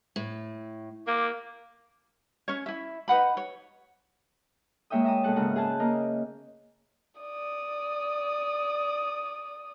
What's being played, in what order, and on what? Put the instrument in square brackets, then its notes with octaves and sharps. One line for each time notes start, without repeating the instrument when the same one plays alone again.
[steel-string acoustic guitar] A2
[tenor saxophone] A#3 [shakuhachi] D6
[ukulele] C#4 C#5
E4 E5
D#4 B4 F#5 B5
C#5
[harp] G#3 A#3 C#5 E5 G5 D#6
E5 A#5 D#6
B2 G#3 A4 F#5 A5
G#2 C#3 A#4 F#5
G#4 E5 G#5 A5 F#6 G6
A#3 A#4 D#5
[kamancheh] D5 D#6